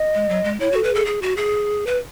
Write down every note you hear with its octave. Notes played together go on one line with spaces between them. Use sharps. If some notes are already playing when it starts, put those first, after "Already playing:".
Already playing: D#5
G#3
F#3
G#3
E4 C#5
F#4 A4
B4
G#4 A4
G#4
F#4
G#4
B4